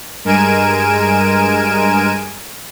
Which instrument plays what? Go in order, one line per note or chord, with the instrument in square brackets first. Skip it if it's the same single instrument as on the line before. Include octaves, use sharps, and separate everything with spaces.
[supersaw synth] G2 G#3 A#4 G#5 D7 E7